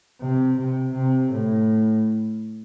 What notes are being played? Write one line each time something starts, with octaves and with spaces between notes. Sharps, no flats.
C3
C3
C3
A2